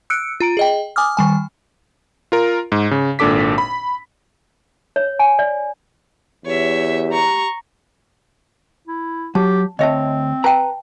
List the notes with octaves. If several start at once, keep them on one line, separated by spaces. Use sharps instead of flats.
E6 F#6 C#7 D7
F4 A#5 D7
G#4 D#5 G5
G#5 D6 D#6 F6
D#3 G3 G#5
F4 A#4
G#2
C#3
G#1 A#2 D4 A4 D6 B6
B5
C#5
G#5
D5
E2 G4 C#5 E5
A#5 C#6
E4
F#3 G4 A5
D2 C4 C#5 D#5 E5 A5
B4 G5 A5 A#5